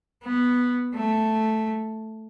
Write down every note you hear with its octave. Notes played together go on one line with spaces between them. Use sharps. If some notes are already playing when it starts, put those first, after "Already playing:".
B3
A3